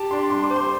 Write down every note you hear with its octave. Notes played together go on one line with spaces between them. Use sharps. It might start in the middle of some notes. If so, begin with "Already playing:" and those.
Already playing: G4 A5
D4 C6
G3 C6
D6
C5
C6